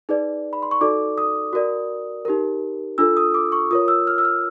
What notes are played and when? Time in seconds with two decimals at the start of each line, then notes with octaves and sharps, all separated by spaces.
0.09 D#4 G#4 B4 D5
0.53 B5
0.62 C6
0.71 C#6
0.81 D#4 F#4 A4 D5 D6
1.18 D#6
1.53 F#4 A#4 D5
2.25 D#4 G4 A#4
2.98 D4 F4 A4 E6
3.17 D#6
3.34 D6
3.52 C#6
3.71 F4 A#4 C#5 D#6
3.88 E6
4.07 F6
4.18 E6
4.25 F6